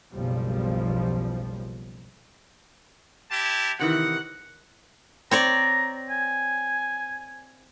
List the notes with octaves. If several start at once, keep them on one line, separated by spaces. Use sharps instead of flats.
F#1 B1 F3 G3
E4 G4 A5
C3 D#3 E3 F#5
C4 C#5 D5 A#5
G#5